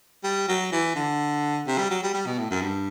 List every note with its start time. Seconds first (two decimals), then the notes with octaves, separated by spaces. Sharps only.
0.24 G3
0.48 F#3
0.72 E3
0.95 D3
1.67 C3
1.78 G3
1.91 F#3
2.03 G3
2.14 G3
2.26 B2
2.39 A2
2.50 F#2
2.62 G2